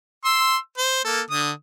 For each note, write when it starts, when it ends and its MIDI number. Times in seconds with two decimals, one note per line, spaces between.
0.25 0.57 84
0.25 0.57 88
0.78 1.01 72
1.05 1.21 58
1.05 1.21 69
1.30 1.51 50
1.30 1.51 87